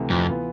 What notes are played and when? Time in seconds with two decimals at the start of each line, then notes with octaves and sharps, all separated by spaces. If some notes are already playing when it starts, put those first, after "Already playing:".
Already playing: D2 C3 E3
0.10 F2
0.28 E3 B3 F4